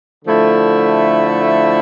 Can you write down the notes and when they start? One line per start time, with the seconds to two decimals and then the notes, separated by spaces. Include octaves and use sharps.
0.24 D3 F3 A3 E4